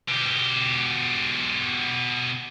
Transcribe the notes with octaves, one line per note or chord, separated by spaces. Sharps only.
B2 G4